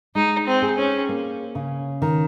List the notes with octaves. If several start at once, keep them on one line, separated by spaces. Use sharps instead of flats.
G#3 D#4
C4
G#4
C#4
A#3
C#3
D#3